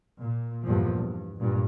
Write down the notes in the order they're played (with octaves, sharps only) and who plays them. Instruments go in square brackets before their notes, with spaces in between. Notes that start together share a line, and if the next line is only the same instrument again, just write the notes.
[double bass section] A#2
E2 G2 A#2 F3
G2
G2 A#2